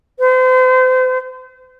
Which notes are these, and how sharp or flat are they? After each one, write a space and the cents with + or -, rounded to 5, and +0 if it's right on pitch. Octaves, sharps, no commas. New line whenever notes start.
C5 -35